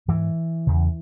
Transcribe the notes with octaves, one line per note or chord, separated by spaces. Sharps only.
G#2 E3
E2 C#3